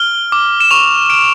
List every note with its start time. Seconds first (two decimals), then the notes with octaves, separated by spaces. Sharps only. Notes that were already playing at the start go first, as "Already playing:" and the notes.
Already playing: F6 G7
0.32 D6
0.60 E7
0.71 C#6 F7
1.10 F6 D7